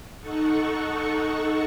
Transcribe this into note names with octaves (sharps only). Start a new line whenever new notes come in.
D#4 A4 F#5 C#6